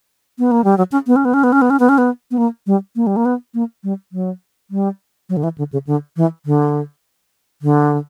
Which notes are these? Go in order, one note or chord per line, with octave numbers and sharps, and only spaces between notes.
B3
A#3
G3
F#3
C#4
B3
C#4
B3
C#4
B3
C#4
B3
C#4
B3
C#4
B3
B3
A#3
G3
A#3
G3
A#3
B3
A#3
G3
F#3
G3
F#3
D3
E3
D3
C#3
D3
E3
D3
D3